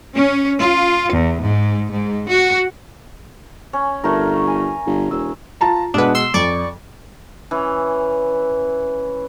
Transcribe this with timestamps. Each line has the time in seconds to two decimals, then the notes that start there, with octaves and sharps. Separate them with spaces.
0.16 C#4
0.61 F4
1.13 E2
1.44 G#2
1.91 G#2
2.29 F#4
3.73 C#4
4.04 G1 A3 A#4
4.47 G#5
4.86 G1
5.11 E1 E6
5.61 F4 A5 A#5
5.94 B2 G#3 D4 B4 F#5
6.15 C6 E6
6.34 F2 D5 C#6
7.51 E3 C#4